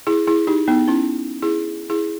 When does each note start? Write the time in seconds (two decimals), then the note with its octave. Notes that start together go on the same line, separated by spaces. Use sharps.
0.07 E4 G#4
0.27 E4 G#4
0.47 D#4 G4
0.68 B3 D#4
0.88 C#4 E4
1.42 E4 G#4
1.90 E4 G#4